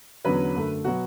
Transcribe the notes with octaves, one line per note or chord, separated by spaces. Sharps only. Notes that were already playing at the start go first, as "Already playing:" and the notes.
E2 D3 F#3 C#4 B4
F#2 D3 A3
B2 F#3 B3 F#4